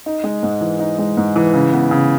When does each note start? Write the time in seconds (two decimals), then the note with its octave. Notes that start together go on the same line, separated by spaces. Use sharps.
0.06 D#4
0.24 G#3
0.43 G#2
0.61 E3
0.79 D#4
0.99 G#3
1.17 G#2
1.36 E3
1.54 C#3
1.73 B3
1.91 C#3